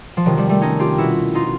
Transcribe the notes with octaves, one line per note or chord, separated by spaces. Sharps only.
F3
C3 D#3 F#3
F3 G3
G3 A3
C#4 D#4
F4 G4
B2 E4 F#4
D#4 F4